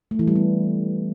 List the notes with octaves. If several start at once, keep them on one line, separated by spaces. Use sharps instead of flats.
A3
E3
G3
B3